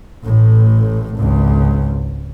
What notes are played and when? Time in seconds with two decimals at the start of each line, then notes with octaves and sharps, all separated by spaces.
0.24 A1 A2
1.15 G#1 C#2